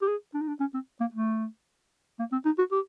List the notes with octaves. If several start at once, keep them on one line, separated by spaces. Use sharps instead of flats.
G4
G#4
D4
D#4
D4
C#4
C4
A#3
A3
A#3
C4
D#4
F#4
G4